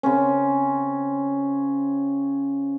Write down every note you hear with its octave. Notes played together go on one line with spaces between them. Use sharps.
C#3 C4 C#4